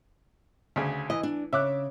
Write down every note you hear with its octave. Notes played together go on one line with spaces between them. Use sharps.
D2 C#3
E3 D#5
D4
C#3 E5 D6 F#6